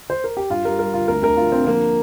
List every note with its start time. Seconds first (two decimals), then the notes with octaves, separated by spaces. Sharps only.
0.10 C5
0.24 A#4
0.37 G4
0.50 G2 F4
0.65 G3 A#4
0.79 G3 A#4
0.94 D3 F4
1.08 D2 A#4
1.22 D2 A#4
1.37 D2 F4
1.52 D3 C4
1.67 F3 A#3